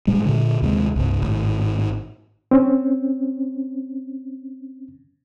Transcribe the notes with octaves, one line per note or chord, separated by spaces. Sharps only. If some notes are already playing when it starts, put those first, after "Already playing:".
A2 G3 G#3
A#2 D3
D#2 C3 G#3
C2 G2
G#1 A2
C4 C#4